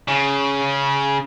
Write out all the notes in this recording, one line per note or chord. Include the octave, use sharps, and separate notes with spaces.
C#3